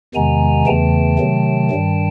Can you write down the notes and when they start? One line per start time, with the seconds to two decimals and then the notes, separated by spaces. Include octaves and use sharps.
0.15 E2 C3 D#3 G#3 B3 G#5 A#5
0.66 E2 C#3 E3 A3 G5 A5
1.19 C3 D#3 F#3 A3
1.70 G2 D#3 G3